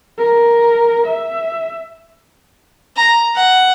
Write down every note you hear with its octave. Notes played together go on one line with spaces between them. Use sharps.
A#4
E5
A#5
F#5